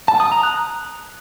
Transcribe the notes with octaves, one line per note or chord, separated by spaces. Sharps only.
A5
D#6
A#5
F#6